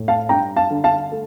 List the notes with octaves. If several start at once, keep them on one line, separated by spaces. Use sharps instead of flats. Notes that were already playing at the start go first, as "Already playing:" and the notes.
Already playing: A2
F5 A5
G2 G5 A#5
F5 A5
D3
F5 A5
A3